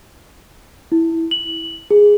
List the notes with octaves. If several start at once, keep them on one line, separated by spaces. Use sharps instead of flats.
E4
F#7
G#4